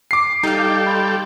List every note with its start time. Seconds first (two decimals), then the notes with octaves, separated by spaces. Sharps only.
0.11 D6 C7
0.43 G3 D#4 G4 A4 F5
0.87 B5 C6